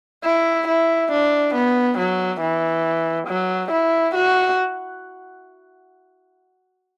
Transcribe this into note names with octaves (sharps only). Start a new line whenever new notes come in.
E4
E4
D4
B3
F#3
E3
F#3
E4
F#4